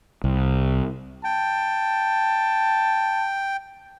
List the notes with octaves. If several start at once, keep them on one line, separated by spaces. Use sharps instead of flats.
C2
G5 A5